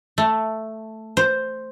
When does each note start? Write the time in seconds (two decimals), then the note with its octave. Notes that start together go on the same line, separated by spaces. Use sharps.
0.18 A3
1.17 C5